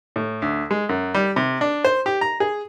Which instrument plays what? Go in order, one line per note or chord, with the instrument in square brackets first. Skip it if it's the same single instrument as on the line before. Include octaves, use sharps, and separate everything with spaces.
[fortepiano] A2
D2
G#3
F#2
G3
C3
D4
C5
G4
A#5
G#4